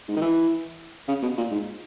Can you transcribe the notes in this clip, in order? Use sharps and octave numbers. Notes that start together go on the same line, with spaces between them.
G#2
D#3
E3
C#3
B2
A#2
G#2